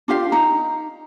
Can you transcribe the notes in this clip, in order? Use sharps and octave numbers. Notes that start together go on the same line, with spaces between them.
D4 F4 G4 F5
D#4 A#5